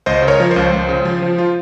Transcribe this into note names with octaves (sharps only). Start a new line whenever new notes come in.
C#2 C5 D#5
C#3
A#4 C#5
F3
C5
C#2
C#2
C#3
F3
F3
F4